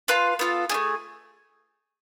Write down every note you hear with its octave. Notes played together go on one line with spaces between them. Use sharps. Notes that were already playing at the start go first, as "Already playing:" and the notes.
F4 B4 F5 A5
B3 F4 A4
A3 D4 G#4